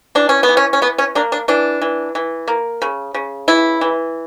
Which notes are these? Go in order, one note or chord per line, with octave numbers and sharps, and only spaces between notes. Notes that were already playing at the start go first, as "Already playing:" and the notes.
E3 D4
C#4
B3
E3
C#4
C#4
E3 B3
C#4
A#3 D4
D4
E3 D4
E3
E3
A#3
C#3
C#3
E3 E4
E3